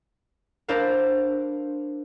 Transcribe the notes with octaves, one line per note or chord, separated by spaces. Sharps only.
D4 E4 A#4 C5 D5 F5